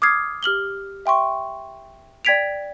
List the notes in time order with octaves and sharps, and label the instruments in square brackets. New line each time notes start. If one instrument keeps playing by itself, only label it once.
[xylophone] D6 D#6 F6 G#6 C7
G4 F6 F#7 G7
E5 G5 C6 C#6
D5 G5 G#6 B6 D7 F7